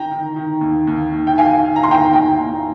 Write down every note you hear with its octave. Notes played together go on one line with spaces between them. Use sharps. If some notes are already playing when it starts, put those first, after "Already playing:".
Already playing: D#3 G5 A#5
D#3
D#3
D#2
D#2
D#3
G5
D#3 F5 G#5
D#3
A#5
C6
D#2 G5 A#5
D#2 G5 A#5
D#2